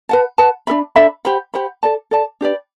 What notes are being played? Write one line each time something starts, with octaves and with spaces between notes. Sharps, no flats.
B4 F#5 A5
B4 F#5 A5
D4 A4 E5 B5
D4 A4 E5 B5
G4 C5 F#5 B5
G4 C5 F#5 B5
A4 D5 A5
A4 D5 A5
D4 G4 B4 D5